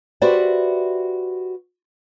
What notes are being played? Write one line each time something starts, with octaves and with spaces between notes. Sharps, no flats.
F#4 G4 B4 C5 D5 E5